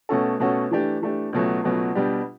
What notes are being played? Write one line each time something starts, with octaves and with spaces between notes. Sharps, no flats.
B2 A3 C#4 F#4 A4
B2 A3 C#4 F#4 A4
E3 A3 D4 G4
E3 A3 D4 G4
C#2 B2 F#3 A3
C#2 B2 F#3 A3
B2 G3 D4 G4